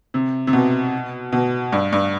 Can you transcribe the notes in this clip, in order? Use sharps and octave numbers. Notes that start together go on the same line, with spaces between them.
C3
C3
B2
B2
G2
G2